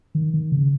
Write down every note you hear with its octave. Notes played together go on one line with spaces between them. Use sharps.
D#3
D#3
C#3